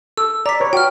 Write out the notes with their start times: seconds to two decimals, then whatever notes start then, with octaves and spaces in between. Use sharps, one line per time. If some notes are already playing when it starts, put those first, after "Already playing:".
0.17 A4 E6
0.46 D5 A#5 B6
0.60 B4 C#5
0.73 F#4 G5 F6